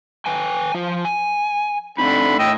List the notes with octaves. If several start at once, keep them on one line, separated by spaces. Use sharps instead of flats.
B4 G5 G#5
F3 F4
G#5
D3 A3 C4 D#4 B5
A2 D#5 G5 E6